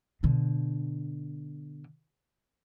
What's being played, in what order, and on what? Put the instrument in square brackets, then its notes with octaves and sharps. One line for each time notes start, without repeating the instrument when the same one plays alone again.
[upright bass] B2 D3